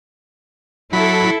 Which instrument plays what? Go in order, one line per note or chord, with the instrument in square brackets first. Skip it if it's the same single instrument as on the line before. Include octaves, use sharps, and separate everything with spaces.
[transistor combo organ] F#3 B5 [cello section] E4 A4